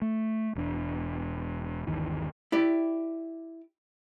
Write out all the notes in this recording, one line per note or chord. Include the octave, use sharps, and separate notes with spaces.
A3
E1 E2 C4 D4
G1 D#2 D#3 E3
E4 G4 D5